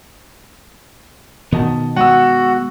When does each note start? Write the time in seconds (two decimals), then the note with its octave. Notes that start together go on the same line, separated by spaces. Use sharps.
1.52 B2 D#3 B3 D#5 A5
1.96 G#3 B3 F#4 F#5 E6